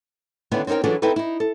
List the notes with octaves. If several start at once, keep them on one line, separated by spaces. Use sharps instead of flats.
D3 D#3 B3 C#4 D4 E4
C4 C#4 D#4 A#4 G5
E3 F#3 D4 F4 G#4 A4
C4 D#4 E4 A4 B4
D#4 E4
A4